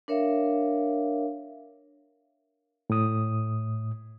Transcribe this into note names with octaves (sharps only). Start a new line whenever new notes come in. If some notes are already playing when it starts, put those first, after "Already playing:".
D4 A#4 C#5 E5 F5
A2 D#6